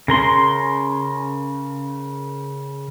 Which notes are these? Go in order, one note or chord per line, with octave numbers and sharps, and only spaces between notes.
C#3 A#4 C6